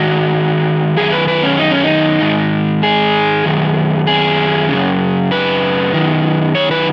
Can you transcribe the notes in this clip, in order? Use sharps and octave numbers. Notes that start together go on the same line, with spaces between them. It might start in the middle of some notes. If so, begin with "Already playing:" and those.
Already playing: G#2 D#3 F#4
F#2 D#3 G#4
B4
B4
C#4
D#4
C#4
D#4
G#2 D#3
G#4
F#2 D#3
G#4
F#2 C#3
B4
F#2 D#3
C#5
B4